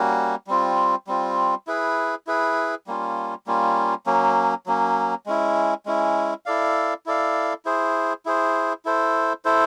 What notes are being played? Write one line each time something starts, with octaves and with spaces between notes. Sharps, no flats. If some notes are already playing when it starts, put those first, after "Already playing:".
Already playing: G3 A#3 C#4 F#4
G3 C4 F4
G3 C4 F4
E4 G#4 B4
E4 G#4 B4
G3 A#3 C#4 F4
G3 A#3 C#4 F4
F#3 A#3 C#4
F#3 A#3 C#4
G#3 C#4 E4
G#3 C#4 E4
E4 A4 D5 F5
E4 A4 D5 F5
E4 G#4 C5
E4 G#4 C5
E4 A4 C5
E4 A4 C5